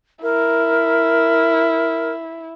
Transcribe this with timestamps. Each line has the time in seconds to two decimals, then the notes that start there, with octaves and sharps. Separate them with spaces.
0.23 E4 A#4